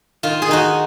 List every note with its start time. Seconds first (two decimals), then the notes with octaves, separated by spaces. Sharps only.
0.23 D#3 F4
0.42 G#4
0.48 D#3 D#4 F#4